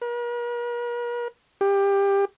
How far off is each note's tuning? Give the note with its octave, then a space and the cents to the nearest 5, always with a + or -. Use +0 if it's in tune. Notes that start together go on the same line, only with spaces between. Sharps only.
A#4 +45
G4 +20